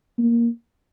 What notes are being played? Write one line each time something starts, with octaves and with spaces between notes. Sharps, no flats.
A#3